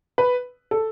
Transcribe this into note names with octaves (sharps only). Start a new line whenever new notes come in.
B4
A4